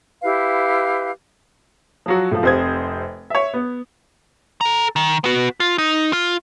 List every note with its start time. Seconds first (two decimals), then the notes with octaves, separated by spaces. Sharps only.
0.22 E4 G4 B4 F5
2.06 F3 F#3 F#4
2.31 A2 F3
2.43 F1 C3 C5 D#6 G#6
3.30 C#5 E5
3.53 B3
4.61 A4 A#5
4.96 D#3
5.24 B3 F#4
5.60 F4
5.78 D#4
6.13 F4